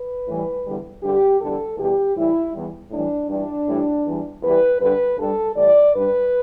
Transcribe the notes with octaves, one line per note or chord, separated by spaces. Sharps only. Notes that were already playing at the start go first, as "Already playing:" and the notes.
Already playing: B4
A2 E3 G3
E2 D3 G3
G2 D3 G3 G4
E2 D3 G3 A4
E2 B2 G3 G4
A2 E3 G3 E4
E2 E3 G3
A2 E3 G3 D4
G2 E3 G3 D4
A2 E3 G3
E2 E3 G3
E2 E3 G3 B4
G2 D3 G3 B4
G2 G3 A4
A2 E3 G3 D5
G2 G3 B4